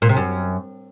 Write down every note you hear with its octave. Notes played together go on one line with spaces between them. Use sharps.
A#2
C3
F#2